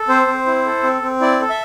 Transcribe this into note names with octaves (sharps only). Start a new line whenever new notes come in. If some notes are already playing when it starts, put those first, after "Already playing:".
Already playing: A4
C4 C5
C4
E4
A4
C4
C4
E4 D5
A4
E5